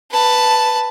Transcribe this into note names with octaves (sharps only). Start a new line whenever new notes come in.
B4 A5